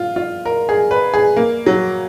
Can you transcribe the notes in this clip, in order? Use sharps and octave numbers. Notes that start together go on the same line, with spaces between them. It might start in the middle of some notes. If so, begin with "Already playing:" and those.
Already playing: F4
F4
A#4
G#4
B4
G#4
A#3
F#3